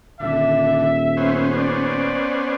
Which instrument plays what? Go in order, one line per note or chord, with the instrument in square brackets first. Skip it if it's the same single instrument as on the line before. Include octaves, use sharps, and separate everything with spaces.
[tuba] D#1 [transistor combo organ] D3 [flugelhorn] E5
[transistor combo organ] B3 C#4 C5
[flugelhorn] D5